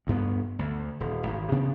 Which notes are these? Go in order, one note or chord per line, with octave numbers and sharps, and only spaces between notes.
D2 G2 B3
D2
D#1
G#1
C3 B3 D4